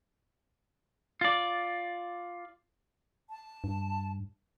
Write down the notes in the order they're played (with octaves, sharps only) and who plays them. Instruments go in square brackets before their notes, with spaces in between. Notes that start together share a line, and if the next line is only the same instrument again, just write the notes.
[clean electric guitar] F4 D5
[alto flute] A5
[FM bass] G2